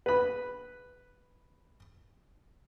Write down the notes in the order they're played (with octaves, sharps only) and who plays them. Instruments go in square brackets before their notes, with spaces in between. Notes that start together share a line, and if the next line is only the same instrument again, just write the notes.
[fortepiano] B4 B5